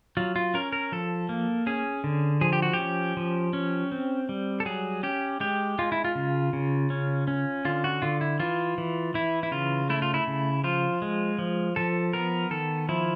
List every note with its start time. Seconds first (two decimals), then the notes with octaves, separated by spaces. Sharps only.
0.17 F#3 F4
0.36 F4
0.54 C#4 A#4
0.72 A#4
0.92 F3 A4
1.29 A#3
1.67 C#4 G#4
2.04 D3
2.41 F3 G#4
2.53 G4
2.62 F#4
2.73 G4
2.79 C#4
3.17 F3
3.53 C#4
3.92 C4
4.29 G3
4.60 A4
4.66 F#3 G#4
5.03 C#4 G4
5.40 G#3 G4
5.79 G#3 F4
5.92 E4
6.04 F4
6.15 C#3
6.53 C#3
6.90 C#4
7.28 C#4
7.65 D3 F4
7.84 F#4
8.02 D3 F4
8.21 E4
8.39 E3 F4
8.78 E3
9.14 E3 E4
9.43 E4
9.52 C#3 F4
9.90 A3 E4
10.02 F4
10.14 E4
10.27 C#3
10.64 F3 F4
11.02 G#3
11.39 F3
11.76 F3 A4
12.13 B3 A#4
12.51 D#3 A4
12.89 F3 E4